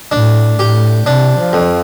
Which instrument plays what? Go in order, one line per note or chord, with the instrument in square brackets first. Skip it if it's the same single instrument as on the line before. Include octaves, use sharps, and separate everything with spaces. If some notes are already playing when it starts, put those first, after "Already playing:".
[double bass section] A2 [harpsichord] D4
[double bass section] A2 [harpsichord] G4
[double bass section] C3 [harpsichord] D4
[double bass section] F3
[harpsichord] F2